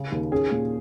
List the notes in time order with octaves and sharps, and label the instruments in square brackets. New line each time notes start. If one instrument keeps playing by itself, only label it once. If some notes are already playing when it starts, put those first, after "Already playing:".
Already playing: [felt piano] C#3
D#2
[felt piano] C#4 [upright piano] G#4
[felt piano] A#2